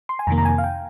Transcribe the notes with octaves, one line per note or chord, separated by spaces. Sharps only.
C6
G#5
F2 C3 D#3 A#3 A#5
A#5
G#5
F5
G5